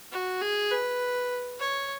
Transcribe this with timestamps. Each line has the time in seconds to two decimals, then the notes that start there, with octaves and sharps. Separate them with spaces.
0.12 F#4
0.41 G#4
0.72 B4
1.59 C#5